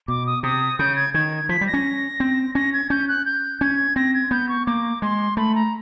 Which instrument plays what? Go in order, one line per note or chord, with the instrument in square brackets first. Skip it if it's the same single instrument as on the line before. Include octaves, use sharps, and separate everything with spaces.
[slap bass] B2 [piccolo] D6
[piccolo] D#6
[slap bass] C3 [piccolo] D#6
[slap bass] C#3 [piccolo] G6
[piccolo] G#6
[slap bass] D#3 [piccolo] G#6
[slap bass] F3 [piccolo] B6
[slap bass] G3
[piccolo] A#6
[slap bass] C#4
C4
[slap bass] C#4 [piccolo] A#6
[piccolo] G#6
[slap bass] C#4 [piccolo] G6
[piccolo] F#6
G6
[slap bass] C#4 [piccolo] G#6
[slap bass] C4 [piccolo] A#6
[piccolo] G#6
[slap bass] B3 [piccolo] G6
[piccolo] C#6
[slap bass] A#3 [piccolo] D6
[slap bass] G#3 [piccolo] C6
[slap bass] A3 [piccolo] B5
[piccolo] A#5